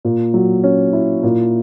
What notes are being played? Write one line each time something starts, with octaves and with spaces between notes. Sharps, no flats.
A#2
F#3
C#4
E4
A#2